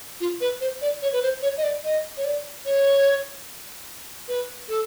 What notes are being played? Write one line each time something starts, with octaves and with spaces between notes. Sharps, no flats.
F4
B4
C5
D5
C#5
B4
C5
C#5
D#5
D5
D#5
C#5
D5
C#5
B4
A4